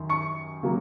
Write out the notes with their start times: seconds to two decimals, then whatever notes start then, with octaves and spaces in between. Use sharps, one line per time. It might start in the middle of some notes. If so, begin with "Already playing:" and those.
Already playing: F#2 D#3
0.10 C#6 C#7
0.63 C#3 F#3 A#3